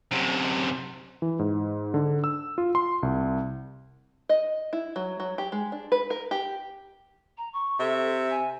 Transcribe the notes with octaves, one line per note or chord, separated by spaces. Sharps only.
F#2 C3
E3
G#2
D3
E6
F4
C6
C2
D#5
E4
F#3
F#3
G4
G#3
D4
B4
A#4
G4
A#5
C#6
C3 A4 E5
G#5